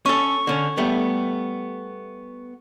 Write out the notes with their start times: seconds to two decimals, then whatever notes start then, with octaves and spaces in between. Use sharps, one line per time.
0.06 C#4 A4 C#6
0.47 D3 C#4
0.77 G3 A3 B3